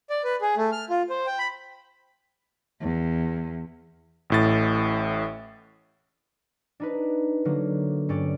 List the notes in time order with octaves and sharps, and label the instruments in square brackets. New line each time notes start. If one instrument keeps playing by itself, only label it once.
[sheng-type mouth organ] D5
B4
G#4
A3
F6
F4
C5
G5
B5
[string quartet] E2
[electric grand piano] A1 A2 A6
[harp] D4 D#4 B4
D3 F#3 A#3
G2 C#4 D5